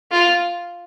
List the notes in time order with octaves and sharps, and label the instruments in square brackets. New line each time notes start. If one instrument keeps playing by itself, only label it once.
[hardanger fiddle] F4